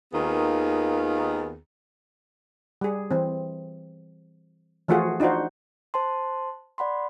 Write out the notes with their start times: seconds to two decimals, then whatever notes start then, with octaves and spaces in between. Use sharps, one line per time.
0.13 D#2 D#3 B3 F4 G#4
2.81 G3 G#4
3.11 E3 C4
4.88 E3 F3 A3 F4 F#4 G#4
5.20 D4 D#4 F4 F#4 C5
5.94 C5 A5 C6
6.78 D5 F#5 B5 C6